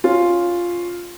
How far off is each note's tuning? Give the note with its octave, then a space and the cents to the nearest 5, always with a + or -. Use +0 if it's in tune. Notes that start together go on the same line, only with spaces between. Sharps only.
C#4 +0 F4 +0